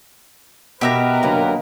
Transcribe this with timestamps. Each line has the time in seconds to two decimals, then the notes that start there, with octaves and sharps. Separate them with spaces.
0.81 B2 G4 A#4 B4 D#5 E5 A#5
1.23 F#2 D3 F#3 A#3